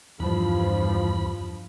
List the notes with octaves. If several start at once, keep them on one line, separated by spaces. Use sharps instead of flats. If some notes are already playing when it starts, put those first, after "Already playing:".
E2 G2 F3 B5